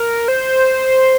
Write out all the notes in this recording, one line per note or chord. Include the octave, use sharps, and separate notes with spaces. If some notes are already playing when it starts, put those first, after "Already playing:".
Already playing: A#4
C5